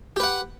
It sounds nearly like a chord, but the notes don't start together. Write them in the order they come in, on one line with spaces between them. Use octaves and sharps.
G4 B4 F#5